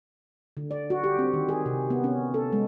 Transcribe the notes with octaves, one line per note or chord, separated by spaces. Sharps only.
D3
D5
F#4
G4
C4
D#3
G#4
C3
B3
C#4
A4
G#3